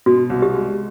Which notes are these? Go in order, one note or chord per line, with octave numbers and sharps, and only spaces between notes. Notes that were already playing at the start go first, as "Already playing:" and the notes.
B2 F#4
C2
G4
G#3